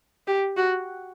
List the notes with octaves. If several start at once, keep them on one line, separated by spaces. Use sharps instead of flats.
G4
F#4